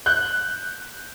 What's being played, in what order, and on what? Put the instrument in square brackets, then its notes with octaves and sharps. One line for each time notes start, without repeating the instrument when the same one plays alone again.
[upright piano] F#6 G6